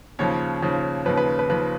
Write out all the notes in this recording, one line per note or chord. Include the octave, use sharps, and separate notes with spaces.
D#2 C#3 F3 C#5
D#2 C#3 F3
D#2 C#3 F3 B4
B4
B4
D#2 C#3 F3 B4